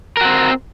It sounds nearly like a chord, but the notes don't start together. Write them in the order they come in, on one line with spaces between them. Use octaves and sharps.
A#4 F#4 C4